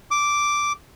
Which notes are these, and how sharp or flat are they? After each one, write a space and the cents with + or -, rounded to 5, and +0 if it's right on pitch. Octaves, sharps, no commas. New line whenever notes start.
D6 -5